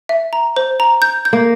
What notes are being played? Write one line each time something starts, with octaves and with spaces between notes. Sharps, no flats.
E5
A#5
C5
A#5
G6
G6
A#3